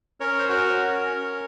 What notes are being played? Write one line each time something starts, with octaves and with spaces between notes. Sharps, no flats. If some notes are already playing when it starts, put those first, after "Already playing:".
C#4 A#4 C#5
C5
F#4 A#4 C#5
C#4
C#4